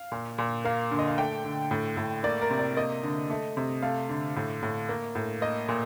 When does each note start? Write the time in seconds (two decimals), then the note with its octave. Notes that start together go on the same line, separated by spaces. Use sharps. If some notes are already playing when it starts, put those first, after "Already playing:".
Already playing: F5
0.12 A#2
0.38 A#2
0.65 A#3 F5
0.91 D3
0.99 D#5
1.08 F5
1.18 A3 G5
1.44 D3
1.71 A2
1.97 A2
2.23 A#3 D5
2.42 A#4
2.50 C3
2.59 D5
2.77 A#3 D#5
3.03 D3
3.30 A3
3.57 C3
3.82 A3 F5
4.09 D3
4.36 A2
4.62 A2
4.89 A#3
5.15 A2
5.42 A#3 D#5
5.69 A#2